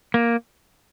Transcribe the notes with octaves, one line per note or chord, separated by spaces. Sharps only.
A#3